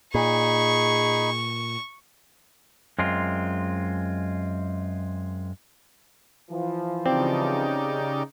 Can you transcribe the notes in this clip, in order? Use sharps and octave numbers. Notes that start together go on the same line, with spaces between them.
A#2 D#4 G#4 B5 C#6
F#2 G#3 C4 F4
E3 F3
C#3 C4 D#4 G4 D5